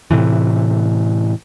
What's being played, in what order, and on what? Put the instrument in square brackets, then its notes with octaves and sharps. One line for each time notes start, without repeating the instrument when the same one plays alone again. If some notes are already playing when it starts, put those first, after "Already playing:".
[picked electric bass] A2 C3 E3